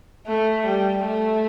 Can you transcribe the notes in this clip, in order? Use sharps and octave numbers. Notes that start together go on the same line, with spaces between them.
A3
G3
A3